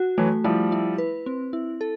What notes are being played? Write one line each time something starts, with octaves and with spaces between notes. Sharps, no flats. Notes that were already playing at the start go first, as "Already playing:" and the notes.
Already playing: F#4
E3 F#3 A3
F3 G3 E4
E4
B4
C4
E4
A4